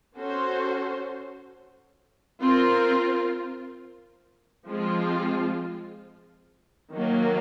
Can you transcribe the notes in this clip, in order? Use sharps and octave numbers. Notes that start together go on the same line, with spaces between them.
C#4 F#4 A4 C5
C4 F4 A#4
F3 G#3 C4 F4
D#3 F#3 A#3